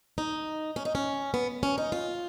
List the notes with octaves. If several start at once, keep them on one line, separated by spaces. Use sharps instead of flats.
D#4
C#4
D#4
C#4
B3
C#4
D#4
F4